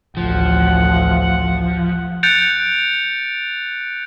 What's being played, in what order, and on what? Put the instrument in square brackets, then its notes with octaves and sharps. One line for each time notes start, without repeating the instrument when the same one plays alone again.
[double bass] A1 D2 [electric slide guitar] F3 [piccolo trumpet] F#5
[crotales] F#6 G6 A6 C#7 D7 F7